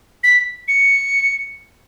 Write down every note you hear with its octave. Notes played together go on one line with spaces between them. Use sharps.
B6
C#7